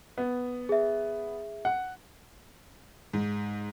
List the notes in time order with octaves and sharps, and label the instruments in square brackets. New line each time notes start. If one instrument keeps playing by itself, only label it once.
[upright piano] B3
[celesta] G#4 E5
[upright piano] F#5
[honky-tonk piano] G#2